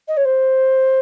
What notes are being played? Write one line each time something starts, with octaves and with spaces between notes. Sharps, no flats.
D#5
C#5
C5